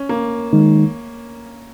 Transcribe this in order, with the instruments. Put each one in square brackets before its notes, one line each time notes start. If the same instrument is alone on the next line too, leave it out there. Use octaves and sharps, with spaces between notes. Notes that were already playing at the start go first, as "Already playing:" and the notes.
Already playing: [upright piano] C#4
A#3
[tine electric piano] D#3 G#3 D#4